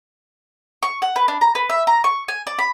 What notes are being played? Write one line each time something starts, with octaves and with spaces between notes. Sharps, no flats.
C#6
F#5
B4
D4
A#5
B4
E5
A#5
C#6
G#5
D5
B5